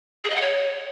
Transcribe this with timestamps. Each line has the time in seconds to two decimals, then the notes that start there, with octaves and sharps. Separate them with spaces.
0.24 G#4
0.30 D#5
0.36 F#5
0.41 C#5